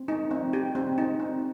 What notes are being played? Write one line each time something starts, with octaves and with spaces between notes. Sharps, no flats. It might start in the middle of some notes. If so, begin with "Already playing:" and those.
Already playing: C4
D#4
C4
G4
C4
D#4
C4